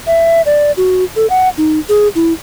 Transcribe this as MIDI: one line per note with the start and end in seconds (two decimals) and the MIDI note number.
0.07 0.41 76
0.46 0.72 74
0.77 1.04 66
1.16 1.27 69
1.30 1.49 78
1.58 1.79 63
1.89 2.08 68
2.15 2.33 64